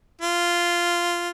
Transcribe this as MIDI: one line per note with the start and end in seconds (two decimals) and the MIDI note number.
0.21 1.29 65